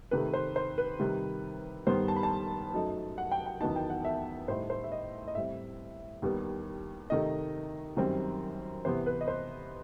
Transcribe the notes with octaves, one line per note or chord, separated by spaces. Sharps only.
C3 D#3 A3 B4
C5
C5
B4
C3 D#3 G3
G2 D#3 G3 B3 C5
A5
B5
A5
F#2 F#3 A3 D#4
F#5
G5
G5
E2 D#3 F#3 B3 D#4 A5
G5
F#5
E5
A2 G3 D#4 C5
C5
E5
D#5
D#5
A2 G3 C4 E5
D#2 D#3 G3 B3
C3 D#3 A3 D#5
F#2 D#3 G3 C4
C3 E3 B3 C5
B4
D#5
C5